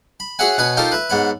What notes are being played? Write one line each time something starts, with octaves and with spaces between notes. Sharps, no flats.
B5
F#4 G#4 C#5 E5 F#5 G#5
B2 B4 C#5 G#5 D#6
D#4 F4 G4 A4 A#4 C5
B4 E5
G#2 B3 C#5 B5